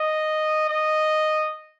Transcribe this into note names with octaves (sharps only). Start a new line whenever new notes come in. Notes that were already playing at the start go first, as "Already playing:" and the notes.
Already playing: D#5
D#5